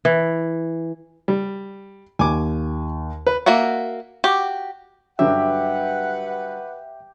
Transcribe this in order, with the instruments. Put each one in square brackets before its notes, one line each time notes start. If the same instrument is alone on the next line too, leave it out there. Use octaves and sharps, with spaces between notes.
[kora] E3
[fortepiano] G3
[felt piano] D#2 [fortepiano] G#5 D6
[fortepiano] B4
[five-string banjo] A#3 F#4 E5 F#5
F#4 G4
[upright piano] G2 D3 F#3 [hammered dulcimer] G4 [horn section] B4 F#5 [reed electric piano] E5